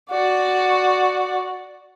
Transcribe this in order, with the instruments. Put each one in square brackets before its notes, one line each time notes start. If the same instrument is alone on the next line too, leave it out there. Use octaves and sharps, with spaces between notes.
[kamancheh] F#4 D5